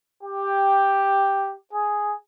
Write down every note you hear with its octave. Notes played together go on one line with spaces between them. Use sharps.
G4
G#4